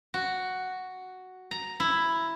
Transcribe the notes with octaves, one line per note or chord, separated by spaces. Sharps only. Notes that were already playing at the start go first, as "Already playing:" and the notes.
F#4
A#5
E4